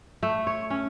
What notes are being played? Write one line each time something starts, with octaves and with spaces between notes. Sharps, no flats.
A3
C#5
C#4